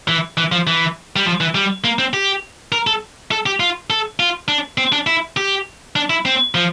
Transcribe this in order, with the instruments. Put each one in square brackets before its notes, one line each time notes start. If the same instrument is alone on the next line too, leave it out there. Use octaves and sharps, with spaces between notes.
[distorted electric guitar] E3
E3
F3
E3
G3
F3
E3
G3
A#3
C4
G4
A#4
A4
A4
G4
F4
A4
F4
D4
C4
D4
E4
G4
D4
E4
C4
F3